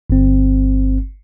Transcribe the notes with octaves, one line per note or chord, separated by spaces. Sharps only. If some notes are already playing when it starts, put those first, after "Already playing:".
G1 C4